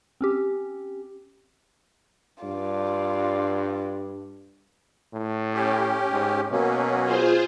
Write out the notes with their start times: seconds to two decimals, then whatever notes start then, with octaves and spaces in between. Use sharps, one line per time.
0.21 C4 C#4 G4
2.44 G2 F4 D5
5.13 A2
5.54 C#4 G4
6.11 G#2
6.51 B2 F#3 A#3 C#4
7.05 F4 G#4 C5